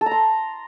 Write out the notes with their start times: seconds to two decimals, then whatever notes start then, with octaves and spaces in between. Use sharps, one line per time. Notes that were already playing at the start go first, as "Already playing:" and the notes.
0.01 A4
0.06 A#5
0.11 C6